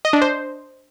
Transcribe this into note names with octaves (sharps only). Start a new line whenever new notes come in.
D#5
D4
C5